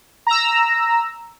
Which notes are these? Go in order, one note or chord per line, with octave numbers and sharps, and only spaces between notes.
A#5 E6